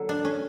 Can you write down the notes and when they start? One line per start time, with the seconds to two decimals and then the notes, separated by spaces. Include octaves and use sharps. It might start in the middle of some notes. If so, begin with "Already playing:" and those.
Already playing: D3 F#3 A#3 A4
0.09 D4
0.25 C#4